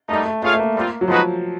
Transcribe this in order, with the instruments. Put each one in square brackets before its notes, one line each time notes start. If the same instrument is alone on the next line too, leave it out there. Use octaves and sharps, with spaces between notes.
[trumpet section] G3 A#3 D#4 [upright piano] A3
[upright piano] A3
[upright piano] A3 [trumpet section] F4 G#4 C#5 F5
[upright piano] A3
A#3
[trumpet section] G3 C4 F4
[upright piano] F#3
[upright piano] F3 [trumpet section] G#3 B3 D#4 F#4 B4